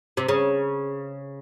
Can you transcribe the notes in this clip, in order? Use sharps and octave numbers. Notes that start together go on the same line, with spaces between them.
C3
C#3